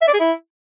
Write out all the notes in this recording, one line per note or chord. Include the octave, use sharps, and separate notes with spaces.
E5
D5
G#4
E4